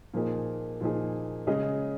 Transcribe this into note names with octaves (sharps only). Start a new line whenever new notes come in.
A#2 F3 A#3 D#4 G#4
A#2 F3 A#3 D#4 G#4
C#3 G#3 C#4 G#4 D#5